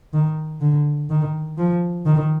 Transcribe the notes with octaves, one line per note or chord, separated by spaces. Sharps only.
D#3
D3
D#3
F3
D#3